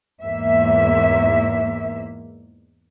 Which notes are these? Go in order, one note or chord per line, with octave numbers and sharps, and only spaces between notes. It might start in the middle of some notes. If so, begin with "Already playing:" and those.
E2 G#2 A#3 E5